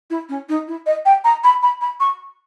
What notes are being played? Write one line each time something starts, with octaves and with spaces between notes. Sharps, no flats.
E4
C#4
D#4
E4
D#5
G5
A#5
B5
B5
B5
C#6